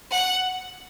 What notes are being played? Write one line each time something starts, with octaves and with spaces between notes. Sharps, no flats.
F#5